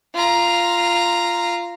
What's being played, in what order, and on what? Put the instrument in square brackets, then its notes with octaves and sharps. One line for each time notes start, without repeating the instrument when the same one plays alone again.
[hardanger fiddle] F4 A#5